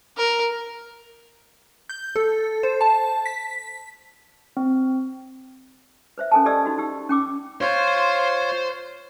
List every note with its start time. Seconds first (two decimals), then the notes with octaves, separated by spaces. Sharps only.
0.17 A#4
1.89 G6
2.16 A4
2.63 C5
2.81 A5
3.26 B6
4.57 C4
6.18 B4 C5 E5
6.31 C#4 A4 A#4 G#5 A5
6.45 G4 A4 D5 D#5 E6
6.65 D#4 F#4
6.78 D#4 G4 E6
7.09 C#4 G5 D6 E6
7.61 F4 C5 C#5 C6